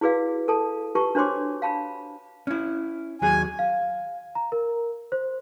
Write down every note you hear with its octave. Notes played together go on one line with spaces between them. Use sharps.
E4 F#4 G#4 B4 D5 F5
A4 A5
F4 G4 B4 A5 C#6
D4 F#4 C5 C#5 C6 D6
F5 A5 B5
C#4 E4
D#2 F#3 G#4 G#5
F5
A#5
A#4
C5